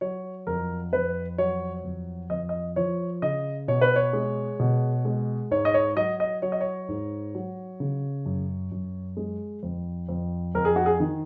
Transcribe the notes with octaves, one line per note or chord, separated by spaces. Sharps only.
F#3 C#5
F2 A#4
F2 B4
F#3 C#5
F2
F2 D#5
D#5
F3 C#5
C#3 D#5
B2 C#5
B4
C#5
G#3
B2
G#3
G#2 C#5
D#5
C#5
F#3 D#5
D#5
F#3 C#5
D#5
C#5
G#2
F#3
C#3
F#2
F#2
G#3
F2
F2
F2 A#4
G#4
F#4
G#4
D#3